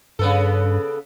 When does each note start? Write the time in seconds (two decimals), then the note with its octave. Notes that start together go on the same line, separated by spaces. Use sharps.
0.19 G2 C#3 B3 A4